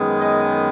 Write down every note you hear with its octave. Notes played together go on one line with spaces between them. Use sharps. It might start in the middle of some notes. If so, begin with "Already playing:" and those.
Already playing: F#2 D#3 G#3 B3
D#5